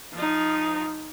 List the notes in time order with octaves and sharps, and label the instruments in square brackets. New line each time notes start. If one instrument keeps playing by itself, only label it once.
[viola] F3 D#4